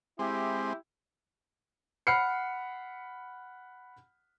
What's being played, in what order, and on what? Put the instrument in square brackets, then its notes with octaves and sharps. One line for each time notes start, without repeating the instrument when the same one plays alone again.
[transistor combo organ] G#3 C4 [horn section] E4 G4
[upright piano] F#5 B5 F6 C7 C#7